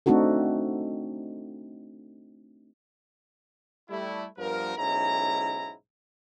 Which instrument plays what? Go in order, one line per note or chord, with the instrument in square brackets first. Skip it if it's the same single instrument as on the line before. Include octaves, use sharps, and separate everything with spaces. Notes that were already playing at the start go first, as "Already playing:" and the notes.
[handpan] A3 C4 D4 D#4 F#4 A4
[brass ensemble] G3 A3 E4
G2 F3 B3 A#4
B1 G#2 C#4 E4 A#5